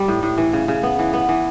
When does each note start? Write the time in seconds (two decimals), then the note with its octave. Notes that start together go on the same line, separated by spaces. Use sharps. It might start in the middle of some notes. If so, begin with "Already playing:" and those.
Already playing: G3
0.08 A2
0.23 A2
0.38 E3
0.53 C#3
0.68 C#3
0.83 B3
0.99 E3
1.13 B3
1.29 E3